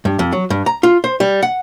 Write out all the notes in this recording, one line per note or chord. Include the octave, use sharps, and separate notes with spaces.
G2
F2
F#3
G2
A#5
F4
C5
G3
F#5